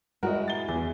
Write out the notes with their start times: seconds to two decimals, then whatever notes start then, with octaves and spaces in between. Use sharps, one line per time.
0.23 G3 G#3 E4 F#4 A#4 D#5
0.48 A6 G7
0.68 E2 G#4